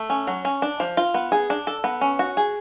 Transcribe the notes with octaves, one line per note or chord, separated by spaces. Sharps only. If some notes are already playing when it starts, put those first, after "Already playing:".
Already playing: A3
C#4
F#3
C#4
D4
F3
F4
B3
G#4
D4
A4
B3
C#4
F#4
G#4